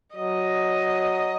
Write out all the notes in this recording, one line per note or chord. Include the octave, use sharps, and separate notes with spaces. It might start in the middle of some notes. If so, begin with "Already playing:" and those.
F#3 D#5